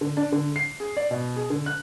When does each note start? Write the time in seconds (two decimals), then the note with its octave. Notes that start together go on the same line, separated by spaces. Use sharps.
0.01 D3
0.17 D4
0.32 D3
0.56 C7
0.80 G#4
0.97 D5
1.11 B2
1.36 G#4
1.50 D3
1.66 F#6